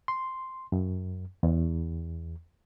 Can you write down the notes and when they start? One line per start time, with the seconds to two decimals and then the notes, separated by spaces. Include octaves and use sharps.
0.08 C6
0.72 F#2
1.43 E2